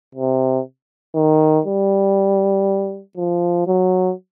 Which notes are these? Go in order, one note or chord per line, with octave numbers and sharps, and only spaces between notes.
C3
D#3
G3
F3
F#3